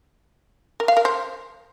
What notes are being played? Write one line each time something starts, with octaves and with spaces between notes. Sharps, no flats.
A#4
F5
A#4
C5